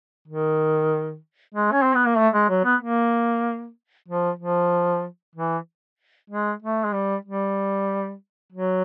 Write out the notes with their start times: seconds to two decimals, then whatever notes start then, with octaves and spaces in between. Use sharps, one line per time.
0.27 D#3
1.54 G#3
1.72 C#4
1.82 C4
1.94 B3
2.05 A#3
2.17 A3
2.34 G#3
2.49 F#3
2.64 B3
2.81 A#3
4.08 F3
4.39 F3
5.35 E3
6.30 G#3
6.62 A3
6.84 G#3
6.94 G3
7.25 G3
8.52 F#3